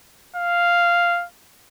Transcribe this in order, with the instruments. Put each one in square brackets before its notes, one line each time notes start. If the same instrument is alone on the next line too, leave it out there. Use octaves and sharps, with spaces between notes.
[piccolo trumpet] F5